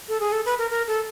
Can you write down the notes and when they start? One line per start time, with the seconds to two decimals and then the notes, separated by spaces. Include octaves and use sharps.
0.09 A4
0.20 G#4
0.32 A4
0.46 B4
0.59 A#4
0.71 A#4
0.87 A4